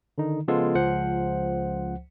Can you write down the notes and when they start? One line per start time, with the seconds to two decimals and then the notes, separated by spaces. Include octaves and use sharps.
0.18 D3 D#3 D#4
0.48 C#3 F3 G#3 B3 F4 A4
0.75 C#2 F3 C5 F#5